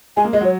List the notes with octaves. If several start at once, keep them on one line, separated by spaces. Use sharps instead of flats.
G#3 G#5
A#3
G#3 D#5
F#3 C#5